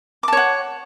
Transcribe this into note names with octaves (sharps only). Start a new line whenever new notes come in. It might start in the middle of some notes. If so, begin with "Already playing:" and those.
C#5 F#5 A5 D6